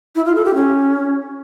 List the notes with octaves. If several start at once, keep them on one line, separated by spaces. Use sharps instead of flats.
E4
F4
A4
G4
C#4